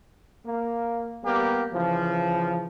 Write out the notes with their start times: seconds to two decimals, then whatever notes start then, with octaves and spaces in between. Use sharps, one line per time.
0.46 A#3
1.23 G3 A#3 B3 G4
1.74 C#3 E3 F3